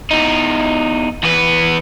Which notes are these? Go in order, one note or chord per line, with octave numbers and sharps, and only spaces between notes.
E2 D#4
E2 B3